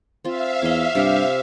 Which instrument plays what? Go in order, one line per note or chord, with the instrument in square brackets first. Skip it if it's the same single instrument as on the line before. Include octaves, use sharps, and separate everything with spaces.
[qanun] C4 F4 [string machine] E5 F5
[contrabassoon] E2 [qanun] C#5 D#5
[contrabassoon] G2 [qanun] C3 G4